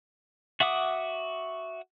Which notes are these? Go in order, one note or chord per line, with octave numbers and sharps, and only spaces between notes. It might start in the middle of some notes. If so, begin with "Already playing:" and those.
F#4 E5 F#5 D6 D#6